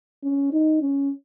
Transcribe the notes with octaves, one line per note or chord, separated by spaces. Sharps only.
C#4
D#4
C#4